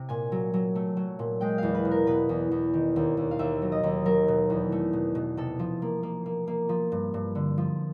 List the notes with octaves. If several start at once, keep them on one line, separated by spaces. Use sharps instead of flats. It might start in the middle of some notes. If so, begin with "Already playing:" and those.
Already playing: C3
A#2 G#5
F#3
F#3
A3
F#3
A#2
G#3 G5
E2 F5
B4
B2
A#4
B2 B4
E2
E2
D#3
D#2
D#2
F5
D#2 E5
F#3
D#5
D#2
F#3 A#4
B2
E2
A3
B2
B2
C3 A4
F3
A#3
A#3
A#3
A#3
F3
G2
G2
D3
F3